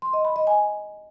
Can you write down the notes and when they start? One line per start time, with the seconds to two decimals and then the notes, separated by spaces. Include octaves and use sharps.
0.02 C6
0.13 D#5
0.25 B5
0.36 D#5
0.47 G#5